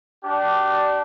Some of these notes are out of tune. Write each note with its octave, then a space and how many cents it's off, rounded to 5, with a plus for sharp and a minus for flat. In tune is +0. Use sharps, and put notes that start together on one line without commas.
D4 +0 G4 -35